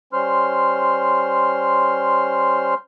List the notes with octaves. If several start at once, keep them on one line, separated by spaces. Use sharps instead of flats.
G3 C#4 C5 C6 F6